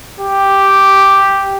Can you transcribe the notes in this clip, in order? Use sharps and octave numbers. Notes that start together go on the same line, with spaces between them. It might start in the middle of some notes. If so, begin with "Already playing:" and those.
G4